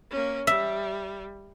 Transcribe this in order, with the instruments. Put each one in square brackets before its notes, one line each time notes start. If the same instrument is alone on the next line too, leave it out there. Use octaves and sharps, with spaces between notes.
[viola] A#3 C#4
[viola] G3 [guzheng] E5